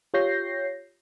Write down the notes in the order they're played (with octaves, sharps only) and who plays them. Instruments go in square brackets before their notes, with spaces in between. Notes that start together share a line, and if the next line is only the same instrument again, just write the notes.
[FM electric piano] F4 G4 C#5 G6 A#6 C7